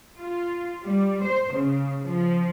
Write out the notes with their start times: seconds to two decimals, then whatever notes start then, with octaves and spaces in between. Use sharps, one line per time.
0.17 F4
0.84 G3
1.24 C5
1.54 C#3
2.03 F3